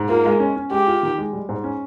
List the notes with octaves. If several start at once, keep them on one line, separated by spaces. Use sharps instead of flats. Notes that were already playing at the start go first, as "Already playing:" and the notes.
Already playing: G#2
A#3 F4
G#3
C#4
C#4
G#3 G4
F4
D#3
G#3
G3
G#2
C#4